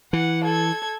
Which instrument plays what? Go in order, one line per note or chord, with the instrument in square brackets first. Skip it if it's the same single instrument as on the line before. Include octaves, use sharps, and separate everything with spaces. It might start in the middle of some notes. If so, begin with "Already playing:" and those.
[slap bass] E3 [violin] F#5
[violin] A4 G#6